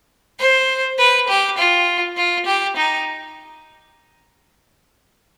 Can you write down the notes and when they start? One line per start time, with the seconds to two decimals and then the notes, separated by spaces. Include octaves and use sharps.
0.40 C5
0.99 B4
1.28 G4
1.58 F4
2.17 F4
2.46 G4
2.77 D#4